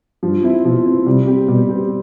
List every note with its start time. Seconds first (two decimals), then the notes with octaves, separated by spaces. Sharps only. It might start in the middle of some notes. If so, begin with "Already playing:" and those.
0.22 G2 F3
0.43 C4 E4
0.64 B2 F3
0.86 C4 E4
1.06 C3 G3
1.27 C4 G4
1.48 B2 G3
1.69 C4 G4